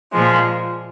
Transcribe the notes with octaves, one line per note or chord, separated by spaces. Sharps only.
A#2 F3 G#3